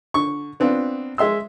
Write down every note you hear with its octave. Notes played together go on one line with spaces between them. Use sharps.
D3 C#6
B3 C4 D4 F4
G#3 E5 C6 E6